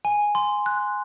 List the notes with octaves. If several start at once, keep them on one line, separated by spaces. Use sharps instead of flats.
G#5
C6
F#6